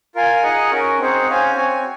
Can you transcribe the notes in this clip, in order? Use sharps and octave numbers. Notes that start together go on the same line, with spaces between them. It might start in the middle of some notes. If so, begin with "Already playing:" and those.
F4 A#4 F5 G#5
D#4 G#4 D#5 F#5
C#4 F#4 A#4
C4 D#4 G#4 C5 F#5
C#4 F#4 C5 F5 G#5
C4 F#4 C#5 G#5